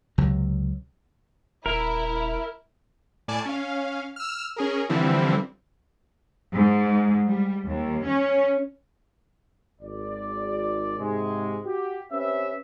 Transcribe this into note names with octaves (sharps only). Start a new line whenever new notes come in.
C#2 C3 F#3
D#1 E4 A#4
A2 D5 G#5 A5
C#4 F5
E6 F6
C#4 G#4 A#4
D3 E3 F3 G3 C4 E4
G#2
G3
D#2
C#4
G#1 D5
G#2 C3 G#3
F#4 G4
C4 C#4 G4 B4 E5